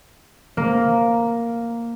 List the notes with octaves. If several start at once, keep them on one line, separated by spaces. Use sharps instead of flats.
A#3